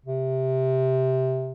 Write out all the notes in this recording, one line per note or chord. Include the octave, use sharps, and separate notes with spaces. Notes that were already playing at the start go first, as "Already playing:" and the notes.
C3